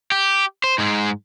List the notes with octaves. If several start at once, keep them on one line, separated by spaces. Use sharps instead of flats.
G4
C5
G#2 G#3